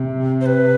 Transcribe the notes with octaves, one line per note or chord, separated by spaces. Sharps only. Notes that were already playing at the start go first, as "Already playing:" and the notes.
Already playing: C3
C5
B4